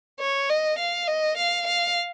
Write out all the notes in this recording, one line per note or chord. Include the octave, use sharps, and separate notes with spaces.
C#5
D#5
F5
D#5
F5
F5